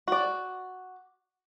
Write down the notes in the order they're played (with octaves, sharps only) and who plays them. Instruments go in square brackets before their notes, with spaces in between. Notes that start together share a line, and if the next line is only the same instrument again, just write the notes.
[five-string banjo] F#4 D5